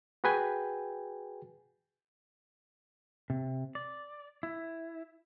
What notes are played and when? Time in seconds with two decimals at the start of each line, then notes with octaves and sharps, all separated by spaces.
0.24 F#4 G#4 B4 G5 G#5
3.30 C3
3.75 D5
4.43 E4